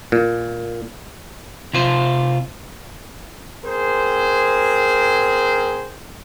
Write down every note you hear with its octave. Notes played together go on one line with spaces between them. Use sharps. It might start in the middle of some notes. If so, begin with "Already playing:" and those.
A#2
C3 F4 C5
C4 G#4 A#4 C5